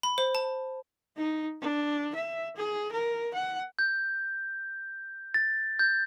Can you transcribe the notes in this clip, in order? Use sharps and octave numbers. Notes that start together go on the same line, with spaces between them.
B5
C5
A5
D#4
D4
E5
G#4
A#4
F#5
G6
A6
G6